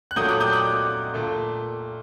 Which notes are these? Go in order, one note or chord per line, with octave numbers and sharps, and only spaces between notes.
F#6
A#2 F#3 A3 D#6 G6
D6 F#6
D#6 G6
D6 F#6
A#2 A3